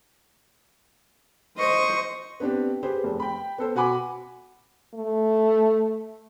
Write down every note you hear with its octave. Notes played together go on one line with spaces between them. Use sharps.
C5 D#5 C#6
B3 C4 D4 G4
G4 G#4 B4 C5
F1
G5 B5
B3 A4 C5
B2 F#4 F#5 G#5 B5 D6
A3